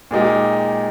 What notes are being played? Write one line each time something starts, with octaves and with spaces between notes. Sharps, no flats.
A#2 G#3 D#4 G4